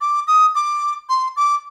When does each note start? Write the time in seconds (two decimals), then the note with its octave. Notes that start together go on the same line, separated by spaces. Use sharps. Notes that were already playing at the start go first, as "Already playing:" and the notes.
0.01 D6
0.28 D#6
0.55 D6
1.09 C6
1.37 D6